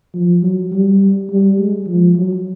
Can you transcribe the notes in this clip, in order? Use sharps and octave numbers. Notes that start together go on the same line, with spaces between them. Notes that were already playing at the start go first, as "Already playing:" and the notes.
F3
F#3
G3
G3
G#3
F3
F#3